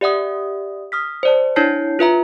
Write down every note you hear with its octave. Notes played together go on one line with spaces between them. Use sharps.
G4 D5 E5 F#5 D#6
D#6 F6 B6
C5 D5 A5
D4 E4 C#5 A5 G6 C7
F4 B4 E5 A#5